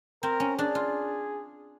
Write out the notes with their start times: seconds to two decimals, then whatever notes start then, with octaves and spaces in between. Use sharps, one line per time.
0.23 C4 A#4
0.40 C#4
0.57 D4 G#4
0.75 F4